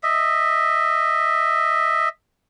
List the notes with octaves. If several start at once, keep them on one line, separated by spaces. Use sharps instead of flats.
D#5 E5